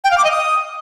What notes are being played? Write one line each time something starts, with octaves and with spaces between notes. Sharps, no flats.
G5
F5
D6
D#5
D#6